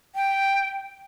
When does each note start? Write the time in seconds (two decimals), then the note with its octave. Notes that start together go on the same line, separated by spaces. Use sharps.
0.15 G5